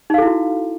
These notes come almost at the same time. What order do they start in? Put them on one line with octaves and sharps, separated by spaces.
D#4 F5 A4 E4 F#4